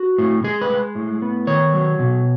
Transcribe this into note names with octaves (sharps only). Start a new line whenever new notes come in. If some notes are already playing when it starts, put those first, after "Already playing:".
Already playing: F#4
A2
G#3 G#4
B4
G#3
A2
B3
D#3 C#5
F#3
B2